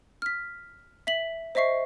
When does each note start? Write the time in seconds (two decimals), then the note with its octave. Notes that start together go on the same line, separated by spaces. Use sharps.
0.22 F6 B6
1.07 E5 B6 F#7
1.55 C5 D#5 E5 C#6 C7